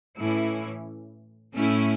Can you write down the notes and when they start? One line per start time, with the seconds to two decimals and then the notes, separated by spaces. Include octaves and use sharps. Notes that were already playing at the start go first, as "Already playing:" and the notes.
0.18 A2 E3 C#4 E4
1.54 A2 A3 C#4 E4